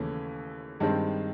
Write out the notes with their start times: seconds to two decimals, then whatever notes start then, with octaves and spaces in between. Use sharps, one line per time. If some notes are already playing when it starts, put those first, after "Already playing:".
Already playing: D#2 C#3 E3 A3 C#4
0.80 G2 D#3 G#3 C4